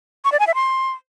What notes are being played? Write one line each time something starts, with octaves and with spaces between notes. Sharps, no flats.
C#6
D5
G#5
E5
C6